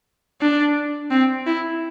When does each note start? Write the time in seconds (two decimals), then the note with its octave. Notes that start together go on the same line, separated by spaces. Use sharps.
0.41 D4
1.11 C4
1.46 E4